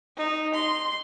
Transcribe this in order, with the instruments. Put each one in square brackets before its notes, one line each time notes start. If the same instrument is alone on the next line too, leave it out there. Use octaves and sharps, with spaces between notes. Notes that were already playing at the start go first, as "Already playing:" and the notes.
[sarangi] D#4
C6